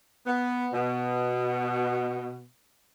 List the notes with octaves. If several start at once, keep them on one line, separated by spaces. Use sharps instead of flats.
B3
B2